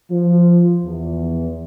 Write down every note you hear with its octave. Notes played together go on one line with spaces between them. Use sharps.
F3
E2